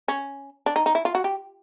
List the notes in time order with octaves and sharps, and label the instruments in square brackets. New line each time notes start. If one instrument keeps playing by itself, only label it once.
[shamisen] C#4
D4
D#4
D#4
E4
F4
F#4
G4